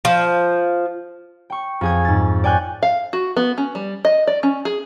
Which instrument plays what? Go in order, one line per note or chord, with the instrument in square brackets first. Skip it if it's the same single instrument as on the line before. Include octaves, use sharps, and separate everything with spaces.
[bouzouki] F3
[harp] G5 C#6
F2 G#4 G#6
G#2 A6
D5 G5 G#5 C#6 F#6 G6
[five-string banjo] F5
F#4
B3
C#4
G3
D#5
D5
C#4
G#4